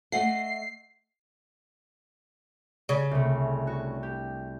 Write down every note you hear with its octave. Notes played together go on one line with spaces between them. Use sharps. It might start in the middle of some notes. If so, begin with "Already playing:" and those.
A3 D#5 F#5 C7
C#3
C2 A3
F#4
G4